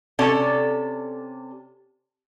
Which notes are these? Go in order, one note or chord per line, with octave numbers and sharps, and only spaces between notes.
C3 C#4 A4 D5